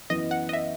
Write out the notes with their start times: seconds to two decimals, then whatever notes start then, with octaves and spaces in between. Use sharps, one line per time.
0.09 F#2 E3 B3 E4 D#5
0.31 F#5
0.49 D#5
0.53 E5